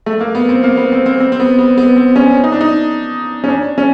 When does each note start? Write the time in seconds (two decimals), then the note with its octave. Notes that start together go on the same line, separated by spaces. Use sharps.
0.06 A3
0.21 A#3
0.35 B3
0.49 C4
0.64 A#3
0.77 B3
0.92 C4
1.06 C4
1.20 C4
1.32 C4
1.40 B3
1.59 B3
1.78 B3
1.96 C4
2.16 C#4
2.44 D#4
2.52 D4
2.61 D#4
3.44 C#4
3.49 D4
3.78 C#4